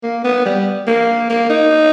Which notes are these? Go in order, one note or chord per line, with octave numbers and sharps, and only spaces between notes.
A#3
B3
G3
A#3
A#3
D#4